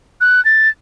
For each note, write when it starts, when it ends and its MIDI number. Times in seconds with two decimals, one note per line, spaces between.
0.21 0.43 90
0.45 0.69 93